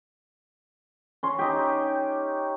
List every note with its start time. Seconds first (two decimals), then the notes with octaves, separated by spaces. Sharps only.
1.23 C#4 C6
1.39 D#4 G4